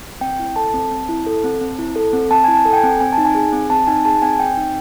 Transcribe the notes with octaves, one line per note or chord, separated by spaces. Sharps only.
C4 G5
E4
A4 A5
C4
C4
E4
A4
C4
C4
E4
A4
C4
C4 A5
E4 G#5
A5
A4
G5
G#5
C4
C4 G#5
A5
D#4
G#5
G#4
C4
C4 A5
D#4 G#5
G#4 A5
C4 G#5
C4 G5
D#4